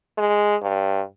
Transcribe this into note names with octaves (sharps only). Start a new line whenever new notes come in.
G#3
G2